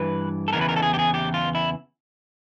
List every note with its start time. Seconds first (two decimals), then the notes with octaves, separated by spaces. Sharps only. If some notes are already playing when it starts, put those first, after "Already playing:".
Already playing: G2 E3 B4
0.48 A4
0.53 E2 C#3 E3 A#4
0.61 B4
0.69 A#4
0.76 A4
0.83 G#4
0.94 G4
0.99 G#4
1.14 G4
1.34 F4
1.55 E4